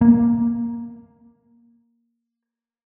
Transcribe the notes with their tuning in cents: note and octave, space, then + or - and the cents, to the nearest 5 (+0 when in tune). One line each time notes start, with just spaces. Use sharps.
A#3 +5